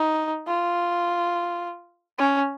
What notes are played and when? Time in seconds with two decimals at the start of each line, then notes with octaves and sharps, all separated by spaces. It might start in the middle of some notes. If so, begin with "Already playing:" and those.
Already playing: D#4
0.47 F4
2.18 C#4